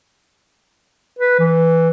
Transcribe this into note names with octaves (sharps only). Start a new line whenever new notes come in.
B4
E3